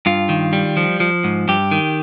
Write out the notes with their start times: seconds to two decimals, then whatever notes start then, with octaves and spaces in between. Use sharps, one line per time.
0.06 G2 F4
0.29 D#3
0.53 G3
0.77 F3
1.00 F3
1.24 G#2
1.48 G2 G4
1.71 D#3